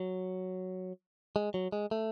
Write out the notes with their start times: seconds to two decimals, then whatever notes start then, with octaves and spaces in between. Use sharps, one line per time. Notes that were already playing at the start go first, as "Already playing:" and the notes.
Already playing: F#3
1.36 G#3
1.54 F#3
1.72 G#3
1.91 A3